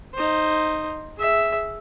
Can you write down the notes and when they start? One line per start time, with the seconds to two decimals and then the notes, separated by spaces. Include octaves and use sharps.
0.14 D#4 C5
1.17 G#4 E5